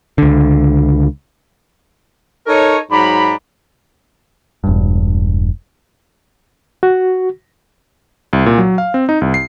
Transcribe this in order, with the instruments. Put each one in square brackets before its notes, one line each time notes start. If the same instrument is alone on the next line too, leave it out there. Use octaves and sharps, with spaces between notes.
[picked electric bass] C#2 D3
[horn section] D#4 A4 A#4 C#5
G#2 F#3 D5 A#5 B5
[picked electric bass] E1 G2
[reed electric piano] F#4
[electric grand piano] C2
A#2
F#3
F5
C4
D#4
C2
C7